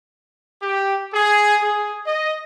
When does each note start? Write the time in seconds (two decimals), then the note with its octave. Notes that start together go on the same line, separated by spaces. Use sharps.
0.62 G4
1.13 G#4
1.61 G#4
2.06 D#5